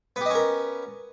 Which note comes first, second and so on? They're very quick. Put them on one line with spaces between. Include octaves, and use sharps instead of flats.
B3 G4 D#5 C#4 A#4